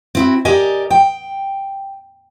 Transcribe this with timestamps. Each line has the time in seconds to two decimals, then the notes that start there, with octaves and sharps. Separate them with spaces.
0.15 C4 E4 F#4
0.45 G4 A#4 D5 D#5 G#5
0.90 G5